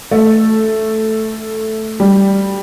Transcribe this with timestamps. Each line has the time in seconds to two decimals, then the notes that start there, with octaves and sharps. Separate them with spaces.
0.11 A3
2.00 G3